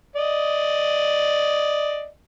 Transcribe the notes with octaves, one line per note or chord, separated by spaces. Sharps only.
D5 D#5